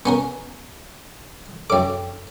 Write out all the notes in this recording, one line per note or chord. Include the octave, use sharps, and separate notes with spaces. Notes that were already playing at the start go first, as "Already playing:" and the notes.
B3 C#4 A#4
F#2 A4 C#5 G5 D6